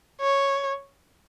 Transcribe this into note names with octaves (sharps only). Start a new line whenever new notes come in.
C#5